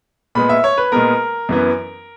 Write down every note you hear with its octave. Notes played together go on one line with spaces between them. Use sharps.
A#2 G#3 B3 B5
E5
C#5
B4
A#2 G#3 B3 A#4
F#2 E3 B3